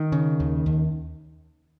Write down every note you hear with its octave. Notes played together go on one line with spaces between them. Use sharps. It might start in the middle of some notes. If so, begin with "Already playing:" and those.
Already playing: D#3
C#3
D#2
D#2